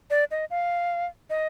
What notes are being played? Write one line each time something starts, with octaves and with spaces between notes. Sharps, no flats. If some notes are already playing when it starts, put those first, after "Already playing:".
D5
D#5
F5
D#5